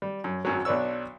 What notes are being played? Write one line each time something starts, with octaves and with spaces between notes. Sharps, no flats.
G3
F#2
G#1 F#2 F#3
B1 D4 B4 C#5 E6